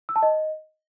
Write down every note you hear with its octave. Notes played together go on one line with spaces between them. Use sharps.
E6
A5
D#5